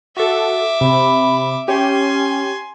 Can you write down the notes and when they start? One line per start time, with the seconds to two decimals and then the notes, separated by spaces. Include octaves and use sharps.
0.17 F#4 A4 E5 D6
0.81 C3 B5
1.68 C#4 G4 C#5 G#5 C6